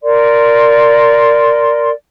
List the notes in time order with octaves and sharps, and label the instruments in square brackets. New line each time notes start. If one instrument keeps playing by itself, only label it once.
[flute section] A#4 D5 C6